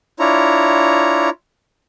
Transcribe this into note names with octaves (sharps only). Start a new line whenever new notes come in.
D4 E4 F4 C#5 A#5